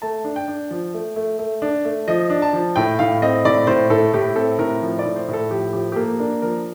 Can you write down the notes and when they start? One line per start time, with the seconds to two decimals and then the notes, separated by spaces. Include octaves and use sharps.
0.02 A3 A5
0.25 D4
0.36 G5
0.48 D4
0.71 F3
0.94 A3
1.16 A3
1.39 A3
1.62 D4
1.85 A3
2.08 F3 D#5
2.30 D4
2.42 A5
2.53 F3
2.76 A2 G5
2.99 A2 F5
3.22 C4 D#5
3.45 A2 D5
3.67 A2 C5
3.90 A2 A4
4.13 A2 G4
4.36 C4 A4
4.58 A2 A#4
4.82 F3
4.99 D5
5.05 A2
5.16 C5
5.28 A2
5.33 A4
5.50 F3 G4
5.73 F3 G4
5.92 G4
5.96 A#3 A4
6.19 D4 A#4
6.42 F3 A#4